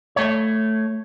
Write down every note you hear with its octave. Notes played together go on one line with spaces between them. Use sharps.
A3 C#5